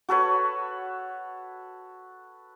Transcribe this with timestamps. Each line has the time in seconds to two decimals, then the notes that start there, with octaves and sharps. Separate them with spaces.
0.09 F#4 A4 B4 C#5